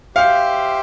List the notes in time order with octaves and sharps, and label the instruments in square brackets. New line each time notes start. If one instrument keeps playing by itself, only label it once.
[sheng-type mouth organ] G4 C5 E5 G5 [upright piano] F5